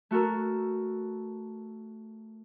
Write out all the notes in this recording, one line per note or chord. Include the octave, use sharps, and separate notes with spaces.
A3 F#4 A4 A#4